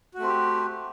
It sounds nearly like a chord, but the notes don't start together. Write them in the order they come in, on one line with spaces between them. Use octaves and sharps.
F#4 A3 C4 G4